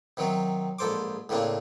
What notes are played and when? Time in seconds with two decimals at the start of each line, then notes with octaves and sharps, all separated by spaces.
0.17 C3 D#3 F#3 C4
0.79 A#1 G#2 A4 C5 C6 D6
1.29 A2 C#3 A#3 C4 D4